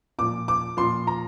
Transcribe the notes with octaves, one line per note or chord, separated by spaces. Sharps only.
A#2 F3 D6
D6
A#2 F3 C6
A#5